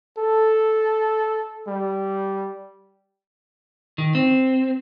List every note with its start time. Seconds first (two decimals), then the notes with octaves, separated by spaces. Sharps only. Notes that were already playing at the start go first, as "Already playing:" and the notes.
0.18 A4
1.68 G3
3.98 D#3
4.15 C4